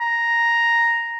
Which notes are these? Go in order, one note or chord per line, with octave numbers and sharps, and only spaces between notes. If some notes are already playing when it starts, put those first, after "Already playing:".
A#5